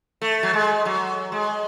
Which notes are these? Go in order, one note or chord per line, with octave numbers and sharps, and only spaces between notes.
A3
F#3
G#3
F#3
G#3